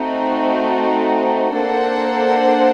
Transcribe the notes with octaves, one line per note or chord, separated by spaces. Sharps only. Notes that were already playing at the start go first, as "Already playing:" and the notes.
Already playing: A3 C4 D#4 F#4
A#3 D4 A4 C5 F#5